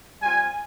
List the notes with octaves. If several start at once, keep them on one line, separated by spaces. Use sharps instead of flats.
G3 C4 F4 G#5